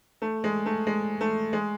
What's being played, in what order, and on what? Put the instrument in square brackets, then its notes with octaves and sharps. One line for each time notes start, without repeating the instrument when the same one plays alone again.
[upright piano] A3
G#3
A3
G#3
A3
G#3